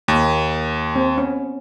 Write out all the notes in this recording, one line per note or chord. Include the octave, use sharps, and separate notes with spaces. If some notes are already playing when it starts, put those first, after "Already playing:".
D#2 A#3
C4
B3 C#4